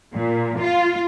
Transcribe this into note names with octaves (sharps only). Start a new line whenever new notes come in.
A#2
F4